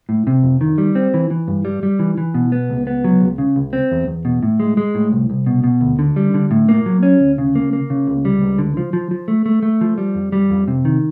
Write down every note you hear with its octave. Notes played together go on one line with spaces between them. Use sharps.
A2
C3
F2
D#3
G3
C4
E3
E3
G2
G3
G3
E3
E3
B2
B3
C#2
B3
F#3
C#2
C#3
C#2
C4
E2
E2
B2
A2
G#3
G#3
A2
C2
C2
B2
B2
D2
D3
G3
D3
A2
A#3
F#3
C#4
D2
C#3
A#3
A#3
C#3
C#2
G3
C#2
D3
F3
F3
F3
A3
A3
A3
F3
G3
F2
G3
F2
C3
D#3